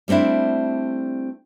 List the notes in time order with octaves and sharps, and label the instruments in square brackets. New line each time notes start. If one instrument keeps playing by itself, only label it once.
[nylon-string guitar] G3 A3 C4 D4 E4